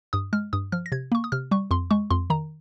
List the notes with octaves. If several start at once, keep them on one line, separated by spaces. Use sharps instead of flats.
G2 D#6
G#3 F6
G2 D#6
F3 F6
A#6
C3 G#6
A#3 C#6
D#6
C3 F6
G3 C#6
F2 C6
G#3 C#6
F2 C6
D#3 A#5